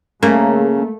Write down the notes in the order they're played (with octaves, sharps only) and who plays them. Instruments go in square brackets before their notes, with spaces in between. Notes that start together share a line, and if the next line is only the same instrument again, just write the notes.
[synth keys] C#3 [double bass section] A3 [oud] A#3